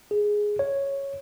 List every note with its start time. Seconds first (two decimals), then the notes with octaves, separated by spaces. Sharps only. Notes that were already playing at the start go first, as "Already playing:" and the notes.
0.11 G#4
0.59 C#5